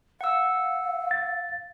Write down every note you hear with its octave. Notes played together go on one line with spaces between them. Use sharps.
F5 F#5 E6
A6